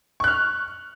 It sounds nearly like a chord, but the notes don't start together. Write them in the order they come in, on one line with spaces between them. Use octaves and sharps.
C#6 F#6 F6